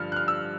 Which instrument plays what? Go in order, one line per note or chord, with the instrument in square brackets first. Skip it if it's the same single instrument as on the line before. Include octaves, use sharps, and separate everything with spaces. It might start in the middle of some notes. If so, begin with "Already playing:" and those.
Already playing: [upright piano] G2 D3 F3 F6
F#6
F6
E6